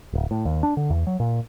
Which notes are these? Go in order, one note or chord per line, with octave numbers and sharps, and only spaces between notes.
D1
A2
D#2
D4
D3
E2
F#3
A#2